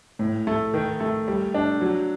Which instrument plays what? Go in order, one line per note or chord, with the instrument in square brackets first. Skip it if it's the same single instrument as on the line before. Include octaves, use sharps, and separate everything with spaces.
[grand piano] A2
A3
D#3
A3
G3
D4
F#3